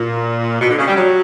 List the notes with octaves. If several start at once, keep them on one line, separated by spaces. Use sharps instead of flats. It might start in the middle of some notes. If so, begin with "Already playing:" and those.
Already playing: A#2
B2
D3
C#3
G3
F#3